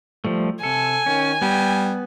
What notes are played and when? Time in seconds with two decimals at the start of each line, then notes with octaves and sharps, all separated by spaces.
0.25 F3 G3 A3
0.63 C3 A4 G#5
1.06 D#3 C#4
1.42 G3 B3